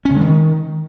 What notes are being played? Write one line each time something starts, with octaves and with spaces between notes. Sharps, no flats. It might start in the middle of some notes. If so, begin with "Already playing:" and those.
C#4
C#3
G#3
D#3